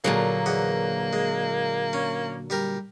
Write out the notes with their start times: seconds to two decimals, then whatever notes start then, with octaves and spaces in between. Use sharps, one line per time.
0.04 A#2 D3 F#3 A#3 G#4
0.46 E2 D#5 F#5
1.13 G#3
1.93 C#4
2.50 G3 G4 A#4